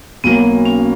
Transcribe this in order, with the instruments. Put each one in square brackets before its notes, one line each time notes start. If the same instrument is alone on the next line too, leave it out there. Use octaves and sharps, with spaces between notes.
[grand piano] B1 B2 F#3 A#3 [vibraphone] B3
[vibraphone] C#4